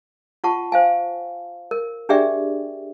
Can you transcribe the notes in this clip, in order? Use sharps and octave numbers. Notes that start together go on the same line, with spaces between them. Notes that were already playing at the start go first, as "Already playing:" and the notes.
F4 F#5 A5 C#6
C5 F5 G#5
A#4
D4 G4 G#4 D5 E5 G5